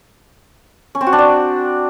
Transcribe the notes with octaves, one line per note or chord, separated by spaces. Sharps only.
C#4
C4
F#4
D4
D5